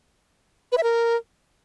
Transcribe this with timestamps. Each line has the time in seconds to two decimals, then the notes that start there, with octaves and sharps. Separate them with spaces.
0.72 B4
0.78 E5
0.83 A#4